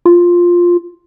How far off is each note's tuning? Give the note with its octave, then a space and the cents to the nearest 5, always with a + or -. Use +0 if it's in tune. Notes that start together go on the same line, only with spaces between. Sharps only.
F4 +5